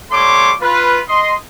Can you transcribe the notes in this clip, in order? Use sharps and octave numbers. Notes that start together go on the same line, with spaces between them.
G3 A3 C#5 C6 D6
F4 B4
D#5 C6